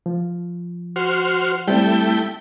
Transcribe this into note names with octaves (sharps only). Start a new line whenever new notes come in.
F3
F#4 C5 F6
G3 A3 C4 E4 G5